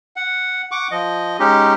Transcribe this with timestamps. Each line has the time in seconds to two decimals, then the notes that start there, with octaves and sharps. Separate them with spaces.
0.16 F#5
0.71 F#5 C#6 D6
0.91 F3 D#5
1.40 G#3 C#4 D#4 G4